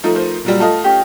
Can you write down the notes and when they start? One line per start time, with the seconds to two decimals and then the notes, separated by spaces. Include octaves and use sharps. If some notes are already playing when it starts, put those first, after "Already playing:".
0.04 F3 A3 D#4
0.15 A#4 C5
0.45 A#2 F#3 G3
0.60 A3 F4 D#5 A5
0.84 C#4 G4